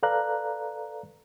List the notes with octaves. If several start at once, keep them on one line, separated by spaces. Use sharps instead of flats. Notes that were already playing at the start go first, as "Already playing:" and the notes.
A4 B4 D5 F5 A#5 F#6